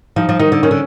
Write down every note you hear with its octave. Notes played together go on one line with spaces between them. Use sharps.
F3 D#4
F3
D#3 D#4
D3
D#3 C#4
D3